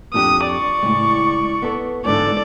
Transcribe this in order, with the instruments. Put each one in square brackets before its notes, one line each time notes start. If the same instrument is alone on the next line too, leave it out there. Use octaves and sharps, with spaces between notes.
[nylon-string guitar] F2 D4 G4 [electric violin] D#6
[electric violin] D5 C#6
[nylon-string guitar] A2 C#3 G#3
B3 A4
[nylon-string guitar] E2 G#2 D3 [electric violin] A4 D5